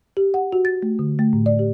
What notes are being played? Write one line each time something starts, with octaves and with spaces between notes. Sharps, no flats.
G4
F#5
F#4
A6
A3
D3
A3
A2
D5
G4